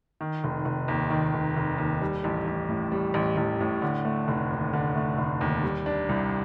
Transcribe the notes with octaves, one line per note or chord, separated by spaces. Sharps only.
D#3
F1
F1
D#2
D#3
F1
F1
D#2
G3
A1
A1
A2
G3
A1
A1
A2
D3
A3
F1
D#2
D3
A3
F1
D#2
G3
D4
C2